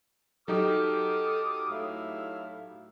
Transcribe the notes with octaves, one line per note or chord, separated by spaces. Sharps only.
F#3 D#4 G4 A4 D6 D#6 F6
A2 E4 F5